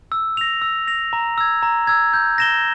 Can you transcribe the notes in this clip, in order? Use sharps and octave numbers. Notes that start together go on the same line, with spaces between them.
E6
A#6 F7
E6
A#6 F7
A#5
E6 G#6
A#5
E6 G#6
G6
A#6 E7 G7